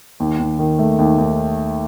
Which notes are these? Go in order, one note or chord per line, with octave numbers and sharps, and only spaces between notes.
D#2
D#2
D#3
A3
D#2
D#2